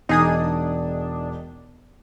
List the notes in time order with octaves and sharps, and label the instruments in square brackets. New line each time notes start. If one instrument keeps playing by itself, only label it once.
[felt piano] E1 [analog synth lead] D4 [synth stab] D#4 G#4 D#6